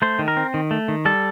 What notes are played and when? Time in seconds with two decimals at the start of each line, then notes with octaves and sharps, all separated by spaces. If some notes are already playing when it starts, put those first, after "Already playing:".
0.02 A3 C5
0.19 D#3
0.28 A#4
0.37 C4
0.54 D#3
0.71 A3
0.88 D#3
1.05 G3 A4